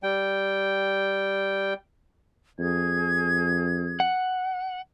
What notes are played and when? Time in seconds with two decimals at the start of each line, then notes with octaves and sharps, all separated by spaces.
0.03 G3 G5
2.58 F2 G#4 G#6
4.00 F#5